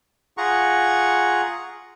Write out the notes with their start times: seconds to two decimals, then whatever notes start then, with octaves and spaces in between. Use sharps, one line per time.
0.38 F4 G#4 F#5 A#5 C#6